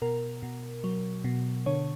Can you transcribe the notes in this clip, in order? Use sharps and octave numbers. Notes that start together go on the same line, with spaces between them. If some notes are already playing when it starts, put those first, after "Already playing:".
B2 A#4
B2
F#3
B2
D3 C#5